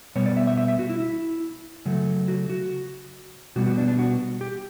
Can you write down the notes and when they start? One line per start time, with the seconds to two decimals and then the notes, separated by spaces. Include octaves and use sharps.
0.16 B2 G3 B3 C#5
0.26 D5
0.37 E5
0.47 E5
0.57 E5
0.68 E5
0.79 F#4
0.90 E4
1.00 E4
1.85 C#3 F#3 A3
2.28 F#4
2.50 F#4
3.56 B2 G3 B3 F#4
3.66 F#4
3.78 D4
3.88 D4
3.99 F#4
4.41 G4